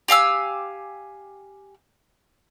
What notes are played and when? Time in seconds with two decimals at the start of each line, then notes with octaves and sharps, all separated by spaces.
0.08 G4 F5 G#5 E6